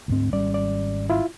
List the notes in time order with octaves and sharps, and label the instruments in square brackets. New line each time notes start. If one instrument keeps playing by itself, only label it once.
[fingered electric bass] D2 G#2 C4
[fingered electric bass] G#1 G3 C#4 [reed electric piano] D5
[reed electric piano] D5
E4 F4